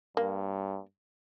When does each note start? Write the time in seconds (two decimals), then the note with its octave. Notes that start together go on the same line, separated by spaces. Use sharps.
0.17 G2 A#3